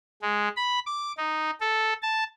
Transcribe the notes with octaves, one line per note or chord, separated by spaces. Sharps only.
G#3
B5
D6
D#4
A4
A5